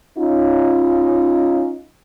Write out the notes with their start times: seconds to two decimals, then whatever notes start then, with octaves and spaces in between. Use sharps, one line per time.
0.17 C#4 D#4 F4